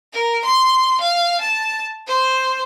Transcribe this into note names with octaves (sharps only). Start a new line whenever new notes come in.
A#4
C6
F5
A5
C5